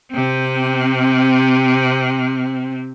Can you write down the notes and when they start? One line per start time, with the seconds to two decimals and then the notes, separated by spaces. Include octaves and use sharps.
0.12 C3 C4